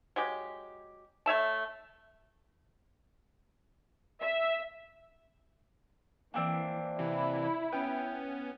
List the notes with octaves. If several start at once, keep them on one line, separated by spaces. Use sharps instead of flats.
F#3 G#3 G4
A3 C#5 E5 A5
E5
E3 A#3 C4 D4
C3 E3 E4
B3 C#4 G5